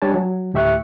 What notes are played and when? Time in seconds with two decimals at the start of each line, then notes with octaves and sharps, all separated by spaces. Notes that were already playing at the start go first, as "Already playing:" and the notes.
0.02 G3 D4 C#5 G#5 A5
0.14 F#3
0.54 D2 A2 G4 E5 C#6 F#6